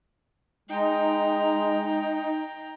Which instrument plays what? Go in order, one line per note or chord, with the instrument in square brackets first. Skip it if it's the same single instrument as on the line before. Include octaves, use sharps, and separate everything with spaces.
[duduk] G#3 [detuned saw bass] D#4 [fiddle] G5 A#5